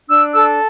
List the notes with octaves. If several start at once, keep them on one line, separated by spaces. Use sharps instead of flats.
D4 E6
A4 E6